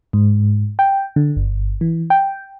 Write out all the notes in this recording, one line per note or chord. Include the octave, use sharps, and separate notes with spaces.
G#2
G5
D3
G1
E3
G5